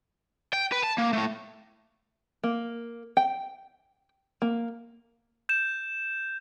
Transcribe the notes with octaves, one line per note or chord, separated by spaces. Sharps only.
G5
B4
A5
A#3
A2 A3
A#3
G5
A#3
G6 E7